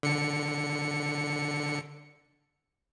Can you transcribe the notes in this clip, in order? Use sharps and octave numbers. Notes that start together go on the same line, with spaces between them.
D3 C#7